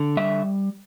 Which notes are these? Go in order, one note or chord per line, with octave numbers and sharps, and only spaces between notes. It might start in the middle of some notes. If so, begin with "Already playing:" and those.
Already playing: D3
G3 E5